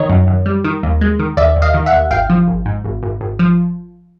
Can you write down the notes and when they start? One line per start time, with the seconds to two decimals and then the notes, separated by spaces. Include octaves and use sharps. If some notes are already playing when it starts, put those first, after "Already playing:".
Already playing: D#3 C#5 D#5
0.09 F#2
0.27 F#2
0.46 G3
0.64 D#3
0.83 D#2
1.01 G#3
1.19 D#3
1.37 D#2 D5 E5
1.56 D#2
1.62 D#5 F5
1.74 D#3
1.86 E5 F#5
1.93 D#2
2.11 G#1 F5 G5
2.30 F3
2.48 G#1
2.66 G#2
2.85 G#1
3.03 G#1
3.21 G#1
3.39 F3